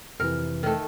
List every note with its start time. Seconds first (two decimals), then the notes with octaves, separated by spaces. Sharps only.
0.20 F2 C3 E3 A#4
0.63 D#3 A3